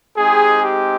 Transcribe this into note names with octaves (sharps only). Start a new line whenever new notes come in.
G#3 C4 D#4 G4 G#4
G4